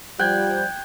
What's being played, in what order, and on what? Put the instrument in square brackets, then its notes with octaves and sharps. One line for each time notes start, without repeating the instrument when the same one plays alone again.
[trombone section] F3 G3 [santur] G5 [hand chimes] F#6 G#6